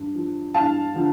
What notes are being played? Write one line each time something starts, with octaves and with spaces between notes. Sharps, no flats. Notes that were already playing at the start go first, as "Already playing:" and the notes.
Already playing: G2
F3
G2 F5 A5
D3 F3